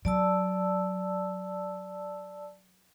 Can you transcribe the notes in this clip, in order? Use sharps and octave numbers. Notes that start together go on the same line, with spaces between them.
F#3 D5 A5 E6